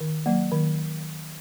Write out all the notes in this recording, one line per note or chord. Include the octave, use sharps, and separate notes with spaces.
D#3
F#3 A#3
D#3